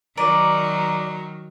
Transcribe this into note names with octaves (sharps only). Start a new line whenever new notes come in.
D#3 F#3 D5 A#5 D#7